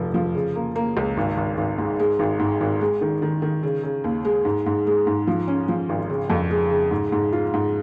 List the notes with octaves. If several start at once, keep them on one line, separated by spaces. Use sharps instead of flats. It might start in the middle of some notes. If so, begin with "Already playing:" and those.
Already playing: F1 F3
F3
C#3
A#3
A#3
C#2
G#1
G#1
G#1
G#2
G#3
G#1
G#2
G#1
G#3
D#3
D#3
D#3
C#3
C#3
D#2
G#3
G#2
G#2
G#3
G#2
F3
C#4
F3
G#1
C#3
F2
G#3
C#3
G#2
G#2
F4
G#2